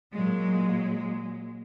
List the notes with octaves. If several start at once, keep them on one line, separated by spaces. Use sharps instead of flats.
A#2 F#3 G#3